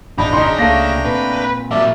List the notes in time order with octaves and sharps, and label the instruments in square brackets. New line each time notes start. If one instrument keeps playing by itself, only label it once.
[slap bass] D1 G1 E2 [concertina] D4 G5 A#5 [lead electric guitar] D#4 [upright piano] B5
[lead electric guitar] C#3 C#4 [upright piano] D#4 C6
[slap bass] C#2 A#3 [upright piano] A3 F5 A#6
[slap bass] A#2 C4 [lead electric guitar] B4
[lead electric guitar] F#3 A#3 [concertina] G4 D5 A5 [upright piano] E5